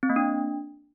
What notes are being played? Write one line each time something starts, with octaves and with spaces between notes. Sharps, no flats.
C4
A#3
D4